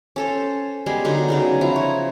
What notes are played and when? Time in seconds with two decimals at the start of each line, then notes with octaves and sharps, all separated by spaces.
0.16 C#4 A4 C5
0.86 G3 G#3 B3 G#4
1.05 D3 F#3 D#4
1.28 C#3 F#3 B3
1.61 F3 E4 A#5
1.76 C#5